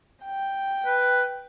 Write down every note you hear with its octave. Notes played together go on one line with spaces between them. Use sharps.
G5
B4